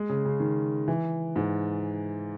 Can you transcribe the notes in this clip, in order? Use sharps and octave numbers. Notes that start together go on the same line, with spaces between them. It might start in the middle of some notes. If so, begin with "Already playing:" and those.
Already playing: G#3
C#3
C#3
D#3
E3
G#2